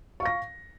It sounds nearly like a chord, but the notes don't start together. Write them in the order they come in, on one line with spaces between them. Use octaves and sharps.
C#6 F5 A#6